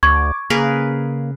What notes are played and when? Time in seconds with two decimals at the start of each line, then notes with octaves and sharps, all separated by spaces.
0.03 D2 C#6 D6 G#6
0.50 C#3 A#3 G#4 A#4 B4